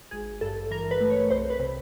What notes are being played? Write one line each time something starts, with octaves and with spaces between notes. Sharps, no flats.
G#1 G#4
G2 A4
E3 A#4
B4
A3
C#5
C2 C5
B4
C3